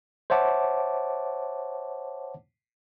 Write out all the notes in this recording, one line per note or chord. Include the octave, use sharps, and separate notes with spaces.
C5 C#5 E5 F#5 A5 D6